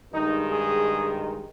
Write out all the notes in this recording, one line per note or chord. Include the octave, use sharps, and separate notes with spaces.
G2 D#3 G#3 D#4
G#4